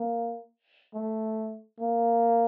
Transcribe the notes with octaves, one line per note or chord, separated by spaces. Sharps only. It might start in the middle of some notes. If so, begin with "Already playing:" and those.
Already playing: A#3
A3
A#3